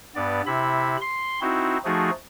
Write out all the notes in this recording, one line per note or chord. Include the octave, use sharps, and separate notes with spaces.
G2 B3 D5
C3 E4 B5
C6
C4 D#4 E4 F#4
F3 A3 D#4 F#4 G#4